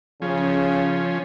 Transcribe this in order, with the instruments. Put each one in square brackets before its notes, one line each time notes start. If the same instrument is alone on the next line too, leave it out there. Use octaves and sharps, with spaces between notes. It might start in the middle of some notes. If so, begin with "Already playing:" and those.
[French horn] C#3 [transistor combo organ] F3 C#4